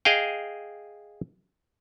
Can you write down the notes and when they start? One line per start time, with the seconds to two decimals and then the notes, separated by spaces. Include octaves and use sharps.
0.05 G#4 D#5 F5 G5